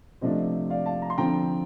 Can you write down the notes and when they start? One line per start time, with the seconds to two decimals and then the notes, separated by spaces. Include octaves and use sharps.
0.21 C3 F3 A3 D4 C5 D#5
0.70 D5 F5
0.86 F5 A5
1.02 A#5
1.10 C6
1.18 D3 F3 C4 G5 A#5